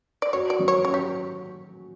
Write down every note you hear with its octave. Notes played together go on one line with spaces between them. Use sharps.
D5
F#4 C#5
D5
F#3
C#5
C#4 C#5
G4